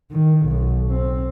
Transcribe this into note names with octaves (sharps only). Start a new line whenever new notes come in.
D#3
B1
C4